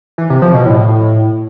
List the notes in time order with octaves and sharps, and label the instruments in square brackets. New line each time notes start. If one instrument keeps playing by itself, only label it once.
[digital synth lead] E3
C3
F3
B2
A2